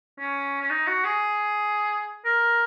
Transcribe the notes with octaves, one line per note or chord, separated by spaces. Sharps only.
C#4
C#4
D#4
F#4
G#4
A#4